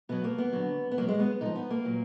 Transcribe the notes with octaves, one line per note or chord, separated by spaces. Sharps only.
B2 F#3 B3
A#3
B3
D3 F#3
B3
B2 F#3 A#3
G#3
B3
D3 F3 D#4
B3
A#3
A#2 F#3